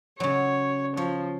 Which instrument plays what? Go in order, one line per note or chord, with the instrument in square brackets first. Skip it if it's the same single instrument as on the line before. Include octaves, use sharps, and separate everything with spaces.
[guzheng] C#3 F#3 [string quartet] C#5
[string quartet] F3 [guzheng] C#5